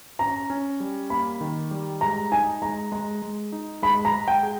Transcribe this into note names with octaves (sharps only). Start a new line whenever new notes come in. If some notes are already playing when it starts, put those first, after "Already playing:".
C#4 A#5
C#4
G3
A#3 B5
D#3
G3
G#3 A#5
D#4 G#5
G#3 A#5
G#3 A#5
G#3
D#4
G#3 B5
A#5
G#3
G5
G#4